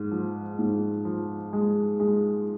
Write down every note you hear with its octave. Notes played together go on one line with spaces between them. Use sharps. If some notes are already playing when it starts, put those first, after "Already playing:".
Already playing: G#2
F3
G#2
F3
G#3
G#3